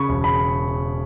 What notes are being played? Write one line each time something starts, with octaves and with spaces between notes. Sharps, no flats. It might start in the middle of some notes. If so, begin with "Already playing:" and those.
Already playing: C#3 B5 C#6
E1
B5